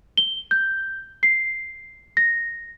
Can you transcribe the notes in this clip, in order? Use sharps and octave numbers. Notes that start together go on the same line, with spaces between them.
G7
G6
C7
A#6